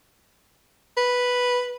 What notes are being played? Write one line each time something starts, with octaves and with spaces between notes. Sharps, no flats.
B4